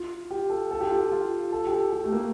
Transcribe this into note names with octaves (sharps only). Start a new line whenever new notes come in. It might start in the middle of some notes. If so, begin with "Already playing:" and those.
Already playing: F4
G4
A4
A4
G4
F4
G4
F4
A4
G4
A4
G4
A3
A#3